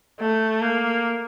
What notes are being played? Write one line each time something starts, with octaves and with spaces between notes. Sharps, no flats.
A3
A#3